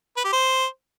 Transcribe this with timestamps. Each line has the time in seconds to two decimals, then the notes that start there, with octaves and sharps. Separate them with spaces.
0.17 B4
0.25 G4
0.33 C5